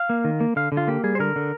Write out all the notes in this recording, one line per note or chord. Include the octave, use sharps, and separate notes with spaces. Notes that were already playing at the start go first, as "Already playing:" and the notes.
Already playing: F5
A#3
D#3
A#3
D3 F5
D3
F4
A#3 G4
G3 G#4
C5
D3 A#4
D3